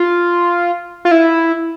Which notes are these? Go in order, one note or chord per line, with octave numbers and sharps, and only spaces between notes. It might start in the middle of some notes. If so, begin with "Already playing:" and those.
Already playing: F4
F4
E4